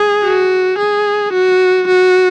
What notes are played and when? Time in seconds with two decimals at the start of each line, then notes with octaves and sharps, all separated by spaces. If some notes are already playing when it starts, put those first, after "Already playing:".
Already playing: G#4
0.23 F#4
0.78 G#4
1.33 F#4
1.87 F#4